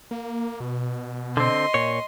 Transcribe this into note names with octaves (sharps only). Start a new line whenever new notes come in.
A#3
B2
D3 C4 D#5 C6
A#2 C#5